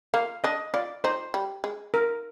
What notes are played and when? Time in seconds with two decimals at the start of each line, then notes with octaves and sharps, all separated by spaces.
0.14 A#3 F5
0.44 D4 D#5
0.74 F4 D5
1.04 D#4 C5
1.34 G3
1.64 G#3
1.94 A#4